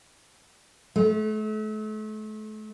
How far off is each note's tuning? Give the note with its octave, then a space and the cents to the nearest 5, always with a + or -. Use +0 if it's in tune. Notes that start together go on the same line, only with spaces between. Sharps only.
A3 -35